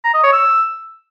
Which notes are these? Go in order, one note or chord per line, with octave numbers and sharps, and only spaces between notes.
A#5
D#5
C#5
E6